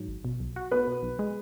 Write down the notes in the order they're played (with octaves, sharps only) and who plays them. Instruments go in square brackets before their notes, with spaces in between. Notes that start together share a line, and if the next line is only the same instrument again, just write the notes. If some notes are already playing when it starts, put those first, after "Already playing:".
Already playing: [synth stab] G#2 F#3
G#1
B2
B1
F#4
[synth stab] B3 [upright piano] B4
[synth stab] B2
B1
G#3